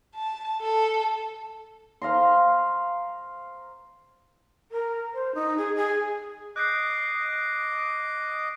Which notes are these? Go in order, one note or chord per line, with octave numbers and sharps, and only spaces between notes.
A5
A4
C5 F5 A#5 C6
A#4
C5
D#4
G#4
G#4
D#5 D6 F#6 G6 C7